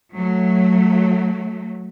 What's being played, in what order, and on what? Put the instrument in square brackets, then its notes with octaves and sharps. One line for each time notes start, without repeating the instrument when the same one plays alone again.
[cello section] F#3 A3